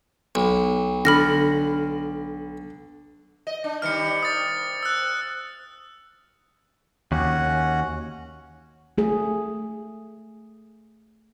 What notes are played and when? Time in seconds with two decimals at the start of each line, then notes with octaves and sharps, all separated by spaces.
0.35 B1
1.05 D3 B5 F6 A#6
3.47 D#5
3.64 D4
3.82 C3 D#3 G3 F6 C#7
4.23 D#6 A6
4.83 E6 F#6
7.12 D#2 C#4 F#4 F#5
8.98 A3 G#4